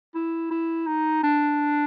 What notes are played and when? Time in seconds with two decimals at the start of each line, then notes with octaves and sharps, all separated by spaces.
0.15 E4
0.51 E4
0.87 D#4
1.23 D4